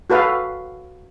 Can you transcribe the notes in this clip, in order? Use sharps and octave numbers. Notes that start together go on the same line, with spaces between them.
F#4 A4 B4 F5